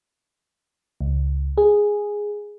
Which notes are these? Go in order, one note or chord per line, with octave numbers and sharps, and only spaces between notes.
C#2
G#4